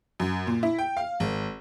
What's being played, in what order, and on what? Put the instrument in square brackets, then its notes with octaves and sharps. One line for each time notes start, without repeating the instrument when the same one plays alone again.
[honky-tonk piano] F#2
A#2
E4
G5
F5
G#1